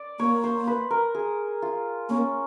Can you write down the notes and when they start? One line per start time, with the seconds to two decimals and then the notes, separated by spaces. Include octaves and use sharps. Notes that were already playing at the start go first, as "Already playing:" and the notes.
Already playing: D5
0.19 A#3 C#5
0.44 C5
0.67 B4
0.91 A#4
1.15 G#4
1.62 F4
2.09 A#3 C#4